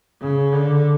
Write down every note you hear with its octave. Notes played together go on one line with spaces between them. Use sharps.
C#3
D3